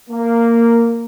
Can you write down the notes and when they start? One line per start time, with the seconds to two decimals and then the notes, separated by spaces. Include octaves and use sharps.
0.10 A#3